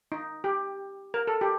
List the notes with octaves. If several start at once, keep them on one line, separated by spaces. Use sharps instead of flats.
D#4
G4
A#4
A4
G4